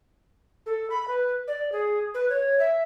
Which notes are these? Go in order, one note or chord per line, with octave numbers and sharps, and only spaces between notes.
A4
B5
B4
D5
G#4
B4
C#5
E5